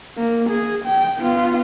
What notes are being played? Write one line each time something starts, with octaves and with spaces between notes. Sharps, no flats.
A#3
G#4
G5
B3 F4